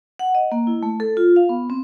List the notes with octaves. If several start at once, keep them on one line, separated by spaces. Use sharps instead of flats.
F#5
D#5
A#3
E4
A3
A4
F4
F5
B3
C4